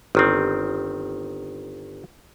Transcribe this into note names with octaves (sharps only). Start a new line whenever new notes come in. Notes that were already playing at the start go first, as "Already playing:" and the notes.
G1 D#3 C4